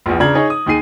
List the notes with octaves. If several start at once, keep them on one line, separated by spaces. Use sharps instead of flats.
A#1 E2
C#3 D4 A#5 G#6 F#7
D#4 G#4 C#5 D#5
D#6
D#2 D#4 G#4 C7 D#7